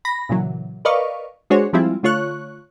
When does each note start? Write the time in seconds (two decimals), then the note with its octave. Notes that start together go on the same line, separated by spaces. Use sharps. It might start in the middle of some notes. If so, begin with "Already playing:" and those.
0.05 B5 A#6
0.29 A#2 C#3 E3 F#3
0.85 A#4 B4 D5 D#5 F5 C#6
1.50 G#3 D4 F#4 G#4 C5 C#5
1.73 F3 G3 G#3 C4 E4 F4
2.03 D3 A3 F4 C#5 C#6 F#6